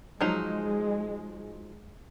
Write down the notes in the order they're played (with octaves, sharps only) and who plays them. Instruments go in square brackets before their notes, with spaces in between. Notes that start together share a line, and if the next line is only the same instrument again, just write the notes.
[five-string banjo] F3 F#3 D#4 [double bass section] G#3